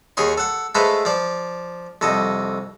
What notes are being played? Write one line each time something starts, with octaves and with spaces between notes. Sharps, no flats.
D#2 G#4 C#5 C6
A4 F#5
G#3 A3 A4 B4 C5 F5
F3 D5
C2 F2 A4 D#5